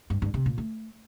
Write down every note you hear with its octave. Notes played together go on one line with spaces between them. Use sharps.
G2
G2
C3
A#2
A3